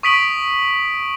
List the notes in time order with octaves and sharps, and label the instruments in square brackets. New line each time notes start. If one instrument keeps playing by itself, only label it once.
[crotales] C#6 D#6 B6 D7 F#7